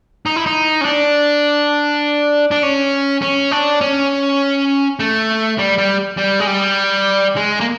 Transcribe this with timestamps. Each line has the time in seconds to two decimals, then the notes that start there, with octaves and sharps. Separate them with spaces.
0.26 D#4
0.36 E4
0.46 D#4
0.81 C#4
0.85 D4
2.51 D4
2.63 C#4
3.22 C#4
3.51 D4
3.81 C#4
4.99 A3
5.58 G3
5.78 G3
6.17 G3
6.40 G#3
6.47 G3
7.36 G#3
7.60 A#3